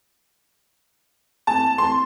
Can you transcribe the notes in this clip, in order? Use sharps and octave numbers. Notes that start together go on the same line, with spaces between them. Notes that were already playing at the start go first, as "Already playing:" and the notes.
A5
C6